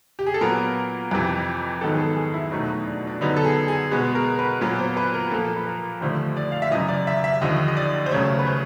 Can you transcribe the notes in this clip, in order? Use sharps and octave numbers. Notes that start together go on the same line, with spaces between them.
G4
G#4
A4
A#2 F#3 B3 A#4
F2 C3 E3
G#2 D#3 F#3 B3 A4
G#4
A4
G#4
E4
E2 B2 F#3 A3 D#4
D4
D4
F#2 D3 F#3 B3 D#4
A4
G#4
G#4
B2 G#3 B3 G#4
A#4
B4
A#2 F#3 B3
C5
B4
A#4
A#2 F3 A#3 A4
B4
A#4
D#2 D3 F3 A3 C5
D5
F5
E5
F#2 C#3 E3 D#5
D5
E5
E5
D#2 D3 F3 D#5
D#5
D5
C5
D2 C#3 F#3 A3 C#5
B4
C5